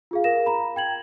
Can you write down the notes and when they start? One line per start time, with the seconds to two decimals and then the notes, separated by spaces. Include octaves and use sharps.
0.11 F4 G#4 F5
0.24 A#4 F5 A#6 E7
0.46 A#5 B5
0.76 G5 G#6 F#7